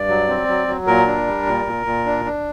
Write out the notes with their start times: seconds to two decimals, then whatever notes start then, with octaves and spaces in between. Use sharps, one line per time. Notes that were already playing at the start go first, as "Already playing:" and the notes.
Already playing: G2 D5
0.09 F#3
0.28 C4
0.48 F#3
0.68 F#3
0.87 A#2 A#4
1.07 D4
1.27 G3
1.47 A#2
1.66 A#2
1.86 A#2
2.06 D4
2.25 D4